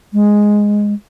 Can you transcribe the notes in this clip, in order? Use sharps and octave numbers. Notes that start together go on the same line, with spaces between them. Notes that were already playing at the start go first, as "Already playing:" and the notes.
G#3